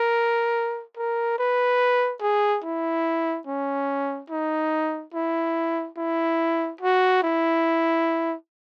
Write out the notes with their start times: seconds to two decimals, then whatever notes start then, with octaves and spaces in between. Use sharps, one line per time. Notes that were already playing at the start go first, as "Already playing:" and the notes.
Already playing: A#4
0.97 A#4
1.39 B4
2.22 G#4
2.64 E4
3.47 C#4
4.30 D#4
5.14 E4
5.97 E4
6.81 F#4
7.23 E4